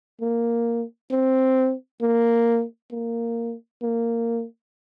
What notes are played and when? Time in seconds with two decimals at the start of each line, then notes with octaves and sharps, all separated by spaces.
0.21 A#3
1.11 C4
2.01 A#3
2.91 A#3
3.82 A#3